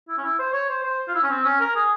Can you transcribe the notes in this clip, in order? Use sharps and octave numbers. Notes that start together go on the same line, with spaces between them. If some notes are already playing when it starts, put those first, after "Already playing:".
E4
C#4
E4
C5
C#5
C5
C5
F4
E4
C#4
C4
C#4
A#4
G#4